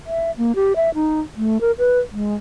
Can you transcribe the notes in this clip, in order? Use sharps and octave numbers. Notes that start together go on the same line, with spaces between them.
E5
A#3
G4
E5
D#4
A3
A#4
B4
G#3